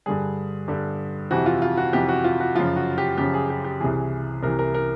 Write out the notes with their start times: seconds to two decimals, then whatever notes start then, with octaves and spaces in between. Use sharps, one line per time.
0.06 G2 D3 G3 G#4
0.68 G2 D3 G3
1.31 F2 C3 E3 F#4
1.46 F4
1.62 F4
1.77 F#4
1.93 F2 C3 E3 G4
2.09 F#4
2.24 F4
2.40 F#4
2.55 F#2 C#3 F3 F4
2.76 F#4
2.98 G4
3.18 F#2 C#3 F3 G4
3.34 G#4
3.50 G4
3.64 G4
3.80 C2 C3 E3 G#4
4.43 C2 C3 E3 A#4
4.59 A#4
4.74 A#4